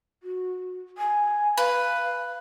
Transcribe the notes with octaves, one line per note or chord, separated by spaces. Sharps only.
F#4
G#5
B4 F5